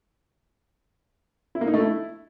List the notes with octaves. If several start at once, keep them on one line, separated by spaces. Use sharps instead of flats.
E4
A#3
D#4
A3
E4